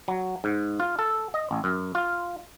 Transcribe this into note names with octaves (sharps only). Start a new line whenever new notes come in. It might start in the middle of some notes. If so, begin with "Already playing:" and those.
F#3
G#2
F4
A4
D#5
A1
F#2
F4